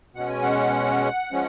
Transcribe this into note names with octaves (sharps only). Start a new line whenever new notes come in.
B2 G#3 C#4 F#5
G#5
F#5
F3 G#3 C#4